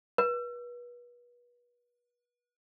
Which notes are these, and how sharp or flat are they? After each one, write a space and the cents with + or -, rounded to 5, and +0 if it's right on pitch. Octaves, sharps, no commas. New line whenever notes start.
B4 -35